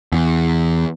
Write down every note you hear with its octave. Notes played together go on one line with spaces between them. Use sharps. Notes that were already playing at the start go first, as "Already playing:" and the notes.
E2